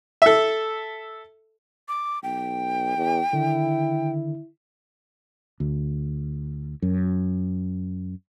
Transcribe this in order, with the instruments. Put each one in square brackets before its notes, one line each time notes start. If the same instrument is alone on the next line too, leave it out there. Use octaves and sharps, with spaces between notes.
[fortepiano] A4 E5
[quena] D6
[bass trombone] B1 [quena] G5
[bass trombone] E2
[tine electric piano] D3 D#3 [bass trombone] E4
[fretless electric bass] D2
F#2